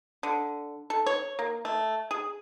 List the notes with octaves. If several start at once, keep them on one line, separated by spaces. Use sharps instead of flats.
D3
A4
C#5
A#3
A3
G#4